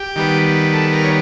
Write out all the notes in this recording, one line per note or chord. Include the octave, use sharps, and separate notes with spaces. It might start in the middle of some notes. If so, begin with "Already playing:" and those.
Already playing: G4
D#3 G3 B3
A4
A#4
C#5